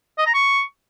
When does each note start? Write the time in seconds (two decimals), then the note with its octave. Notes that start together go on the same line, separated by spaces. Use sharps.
0.18 D#5
0.26 A#5
0.34 C#6